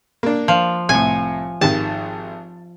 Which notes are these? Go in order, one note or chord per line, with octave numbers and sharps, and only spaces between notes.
A#3 D4
F3
C2 A2 G#5
G#1 D#3 G4 A5